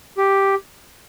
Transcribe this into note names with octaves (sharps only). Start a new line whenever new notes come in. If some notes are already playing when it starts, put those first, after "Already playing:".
G4